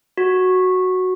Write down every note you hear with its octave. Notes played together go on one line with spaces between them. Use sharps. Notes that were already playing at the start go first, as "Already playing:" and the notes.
F#4